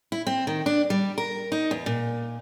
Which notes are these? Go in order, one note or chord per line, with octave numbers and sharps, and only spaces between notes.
E4
C4
D#3
D4
G3
A#4
D#4
E2
A#2